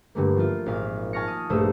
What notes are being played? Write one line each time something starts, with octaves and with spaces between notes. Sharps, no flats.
G2 D3 A3 A#3
F3 E4 F4
G#1 A#2 F5 B6
G#5 A5 C#6 F6 A#6 C#7
D#6
A#1 G2 A3 C5 E6 D#7